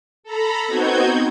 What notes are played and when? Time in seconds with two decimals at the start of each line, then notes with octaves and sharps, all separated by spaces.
0.23 A4 A#5 B5
0.67 B3 C4 D#4 F#4 G6 G#6